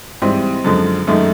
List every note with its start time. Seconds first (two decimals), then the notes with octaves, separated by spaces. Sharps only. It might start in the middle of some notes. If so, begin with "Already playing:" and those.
0.22 G#2 E3 G3 C4
0.64 F#2 D3 F3 G#3
1.07 F#2 D#3 G#3 A3